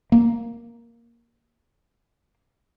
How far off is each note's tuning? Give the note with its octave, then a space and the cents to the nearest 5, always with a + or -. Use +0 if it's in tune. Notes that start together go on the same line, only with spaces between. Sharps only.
A#3 +5